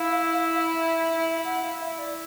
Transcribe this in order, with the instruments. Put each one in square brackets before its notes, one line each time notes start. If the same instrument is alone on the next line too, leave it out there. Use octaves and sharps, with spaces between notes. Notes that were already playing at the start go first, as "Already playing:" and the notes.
Already playing: [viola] E4 [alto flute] F5
[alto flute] E5
F#5
F5
E5
D5